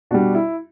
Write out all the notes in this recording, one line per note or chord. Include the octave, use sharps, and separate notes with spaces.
B2 G3 D4 F#4
E4